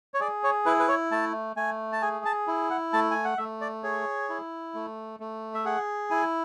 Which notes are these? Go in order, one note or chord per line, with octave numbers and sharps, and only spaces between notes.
C#5
G#4 D5
C#5
E4 B4
B4
C#5
A3 A5
A3 G#5
A5
G#4 G#5
A5
E4
F#5
A3 A5
G#5
F#5
A3 E5
D5
G#4 C#5
E4
A3
A3
E5
G#4 F#5
E4 G#5